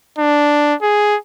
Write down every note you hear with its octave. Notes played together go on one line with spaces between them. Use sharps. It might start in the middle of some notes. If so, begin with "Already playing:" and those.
D4
G#4